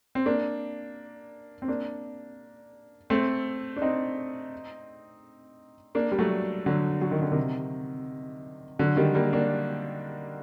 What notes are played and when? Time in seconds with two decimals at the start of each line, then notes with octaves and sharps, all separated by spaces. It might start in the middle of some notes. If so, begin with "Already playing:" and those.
0.15 C4
0.26 A#3 D4
1.62 C4
1.68 A#3 D4
3.10 A3 C4
3.76 D4
3.82 C4 D#4
5.95 A#3 D4
6.12 G3
6.19 F#3 A3
6.66 D3 F#3
7.02 F#3
7.11 D#3
7.22 D3
7.32 C3 D#3
8.79 D3 F#3
8.97 D#3 G3
9.14 G3 A#3
9.33 A#3 D4